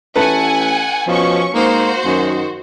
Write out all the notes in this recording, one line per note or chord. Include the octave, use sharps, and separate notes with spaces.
A1 A3 A4 B4 F#5 G#5
B2 F3 C#4 C#6
G#2 A#3 F#4 C5
F#2 D#3